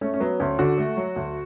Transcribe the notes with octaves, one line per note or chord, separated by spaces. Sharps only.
A3 C#4
C#4
F#3 B3
D2 C#4
D3 F#4
A3
F#3
D2